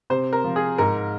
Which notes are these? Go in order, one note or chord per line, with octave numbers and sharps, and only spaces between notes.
C3 C5
A#4
F3
G#4
G#2 A#4